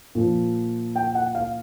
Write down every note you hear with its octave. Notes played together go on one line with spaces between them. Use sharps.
A#2 F3
G5
F#5
F5